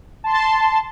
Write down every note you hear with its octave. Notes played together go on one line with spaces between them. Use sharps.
A5 C6